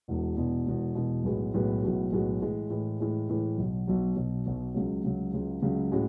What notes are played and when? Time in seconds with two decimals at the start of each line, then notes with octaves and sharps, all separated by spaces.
0.08 E1 E2 B2
0.37 E1 E2 B2
0.66 E1 E2 B2
0.95 E1 E2 B2
1.24 B1 A2 G#3 B3 F#4
1.54 B1 A2 G#3 B3 F#4
1.83 B1 A2 G#3 B3 F#4
2.12 B1 A2 G#3 B3 F#4
2.42 A2 E3 G#3
2.70 A2 E3 G#3
3.00 A2 E3 G#3
3.29 A2 E3 G#3
3.57 B1 B2 F#3
3.87 B1 B2 F#3
4.16 B1 B2 F#3
4.46 B1 B2 F#3
4.74 C#2 C#3 F#3
5.04 C#2 C#3 F#3
5.33 C#2 C#3 F#3
5.62 C#2 C#3 F#3
5.92 A2 G#3 C#4 F#4